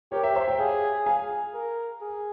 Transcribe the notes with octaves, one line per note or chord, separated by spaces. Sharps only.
G4 A#4 C#5
E5 G5
C5 E5
E5 G5
G#4 C#5 F5
G#4 F5 G#5
A#4
G#4